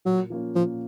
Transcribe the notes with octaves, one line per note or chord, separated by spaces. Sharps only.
A#2 F#3
F3 A#3 C#4 F4
A#2 F3